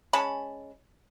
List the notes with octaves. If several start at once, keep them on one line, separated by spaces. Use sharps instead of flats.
G#3 C#4 A5 B5